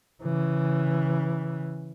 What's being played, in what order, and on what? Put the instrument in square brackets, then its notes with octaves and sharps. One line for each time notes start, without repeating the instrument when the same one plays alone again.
[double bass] C#3 E3